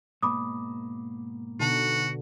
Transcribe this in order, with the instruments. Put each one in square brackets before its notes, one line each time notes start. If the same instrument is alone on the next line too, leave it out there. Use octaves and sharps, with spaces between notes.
[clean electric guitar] G#2 B2 A#3 [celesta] B5 D6 D#6
[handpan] B2 D3 [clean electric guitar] D#4 A5 [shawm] F#4